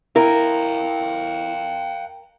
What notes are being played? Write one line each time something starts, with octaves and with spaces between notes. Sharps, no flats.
E4 A#4 F5 G5